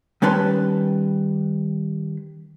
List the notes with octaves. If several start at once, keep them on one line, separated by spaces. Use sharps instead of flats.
D#3 G3 C#4 B4 A5 C6